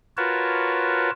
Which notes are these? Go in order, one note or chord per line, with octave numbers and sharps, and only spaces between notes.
F4 F#4 A#4 B4 C#5 A5